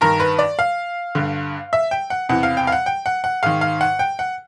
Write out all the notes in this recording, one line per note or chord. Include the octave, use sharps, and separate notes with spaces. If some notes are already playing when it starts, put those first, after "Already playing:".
G2 D#3 A#4
B4
D5
F5
G2 D3
E5
G5
F#5
E2 C3 E3 F#5
F5
G5
F5
F#5
G5
F#5
F#5
G#2 D#3 F5
F5
F#5
G5
F#5